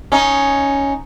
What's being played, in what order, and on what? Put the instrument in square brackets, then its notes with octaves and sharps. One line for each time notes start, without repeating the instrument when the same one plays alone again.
[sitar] C#4 D#4